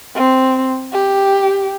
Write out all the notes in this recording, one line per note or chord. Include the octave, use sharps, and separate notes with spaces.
C4
G4